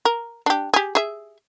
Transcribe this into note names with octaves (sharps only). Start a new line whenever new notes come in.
A#4
D4 G4
G4 G#4
G#4 E5